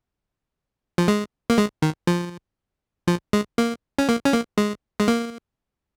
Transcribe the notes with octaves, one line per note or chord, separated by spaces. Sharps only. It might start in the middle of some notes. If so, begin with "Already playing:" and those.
F3
G#3
A#3
G#3
D#3
F3
F3
G#3
A#3
C#4
A#3
C#4
A#3
G#3
G#3
A#3